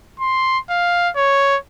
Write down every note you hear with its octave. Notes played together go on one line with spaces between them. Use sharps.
C6
F5
C#5